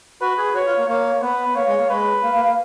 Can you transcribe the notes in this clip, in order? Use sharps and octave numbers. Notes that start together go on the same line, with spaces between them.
F#4 B4
G#4
F#4 C#5
F4
A#3
A#3 C#5
B3 B4
A#3 C#5
G#3
A#3
G#3 B4
A#3
A#3
A#3